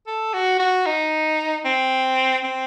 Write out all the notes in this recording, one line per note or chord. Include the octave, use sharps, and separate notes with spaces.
A4
F#4
F#4
D#4
C4
C4